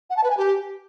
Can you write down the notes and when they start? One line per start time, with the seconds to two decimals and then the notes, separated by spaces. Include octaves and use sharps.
0.09 F#5
0.16 A5
0.23 B4
0.30 G#5
0.37 G4